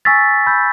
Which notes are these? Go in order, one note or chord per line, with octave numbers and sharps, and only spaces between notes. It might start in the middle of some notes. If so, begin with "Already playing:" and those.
G#5 C#6 E6 A6 B6
B5 E6 G6